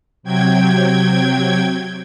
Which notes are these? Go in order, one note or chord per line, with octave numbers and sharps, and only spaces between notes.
C3 F#3 G5 G#6